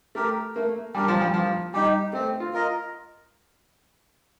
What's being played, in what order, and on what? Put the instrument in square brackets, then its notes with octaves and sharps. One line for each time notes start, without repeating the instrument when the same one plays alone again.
[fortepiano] A3 [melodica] G4 A#4
[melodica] A3 [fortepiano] A#3
[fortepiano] G3 [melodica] D4 G4 A#4
[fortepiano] F3
G3
[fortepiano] F3 [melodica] A#3
[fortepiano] G3 [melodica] D#4 G4
[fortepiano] A3 [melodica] C4
[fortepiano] F4
[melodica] F4 A#4 D#5